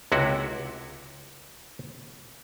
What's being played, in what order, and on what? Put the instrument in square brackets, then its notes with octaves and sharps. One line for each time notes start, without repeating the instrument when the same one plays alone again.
[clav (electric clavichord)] C#2 C3 E4 F#4